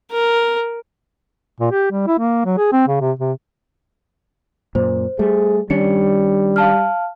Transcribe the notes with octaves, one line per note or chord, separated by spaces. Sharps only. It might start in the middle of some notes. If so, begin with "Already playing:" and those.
A#4
A#2
G4
G3
E4
A#3
F#3
G#4
C4
C#3
C3
C3
F#2 A#2 C5
G3 A3 G#4
D#3 G3 C#4 D4 C#7
F5 A5 F6